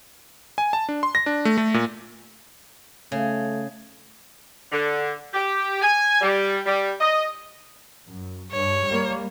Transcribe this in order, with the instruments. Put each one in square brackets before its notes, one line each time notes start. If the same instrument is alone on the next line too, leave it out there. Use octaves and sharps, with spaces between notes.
[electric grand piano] G#5
A5
D4
C6
A#6
D4
A3
A3
A#2
[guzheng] C#3 [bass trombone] A3
[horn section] D3
G4
G#5
G3
G3
D#5
[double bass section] F#2
[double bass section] G2 [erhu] C#5
[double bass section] G3 A#3